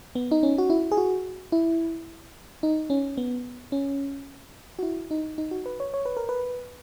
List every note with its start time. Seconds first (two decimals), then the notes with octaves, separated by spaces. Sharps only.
0.15 B3
0.31 D#4
0.43 C#4
0.58 F#4
0.70 E4
0.92 G#4
0.97 F#4
1.52 E4
2.63 D#4
2.90 C#4
3.17 B3
3.72 C#4
4.79 F#4
4.83 E4
5.11 D#4
5.38 D#4
5.51 F#4
5.66 B4
5.80 C#5
5.94 C#5
6.05 B4
6.17 A#4
6.29 B4